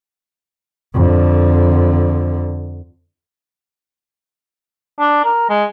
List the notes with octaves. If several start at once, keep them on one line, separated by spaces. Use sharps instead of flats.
F2 D3
D4
A#4
G#3